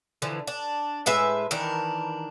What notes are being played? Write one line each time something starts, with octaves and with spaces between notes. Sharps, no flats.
D3 E3 F3
D4
A2 G#3 B4 E5
D#3 E3 D4 A#4